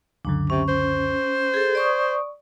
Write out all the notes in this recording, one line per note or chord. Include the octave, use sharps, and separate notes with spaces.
C#2 F#2 D3 D4
C3 C#4
C5
G#4 A4 G#6
D5 C#6 D#6